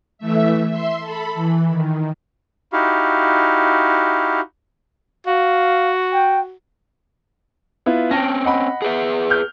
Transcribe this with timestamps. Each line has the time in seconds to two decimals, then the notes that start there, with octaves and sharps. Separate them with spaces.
0.18 E3 A3 E5
0.69 E5 C6
0.99 A4 B5
1.35 E3
1.68 D#3
2.73 D#4 E4 F#4 G4 F5
5.27 F#4 F5
6.13 G5
7.86 B3 E4 F4
8.11 C4 C#4 G5 A5 A#6
8.45 D#5 F#5 B5
8.82 G#4 B4 E5
9.30 F6 G6